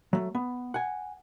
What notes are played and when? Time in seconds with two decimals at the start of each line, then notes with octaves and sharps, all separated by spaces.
0.13 F#3 A3
0.35 B3
0.74 F#5 G#5